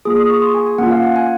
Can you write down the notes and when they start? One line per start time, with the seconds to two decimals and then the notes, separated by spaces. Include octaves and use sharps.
0.05 A#3 F4 G#4 D#6
0.17 D#6
0.30 C#6
0.42 C6
0.55 G#5
0.67 G#5
0.78 A#3 C#4 F4 F#5
0.91 F5
1.03 F#5
1.16 G#5